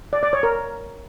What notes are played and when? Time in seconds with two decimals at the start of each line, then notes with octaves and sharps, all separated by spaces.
0.13 D5
0.23 D5
0.33 C#5
0.43 A#4